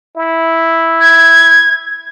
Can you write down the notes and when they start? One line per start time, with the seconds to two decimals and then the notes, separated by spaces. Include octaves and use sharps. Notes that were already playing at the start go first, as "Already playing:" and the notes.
0.16 E4
1.01 G#6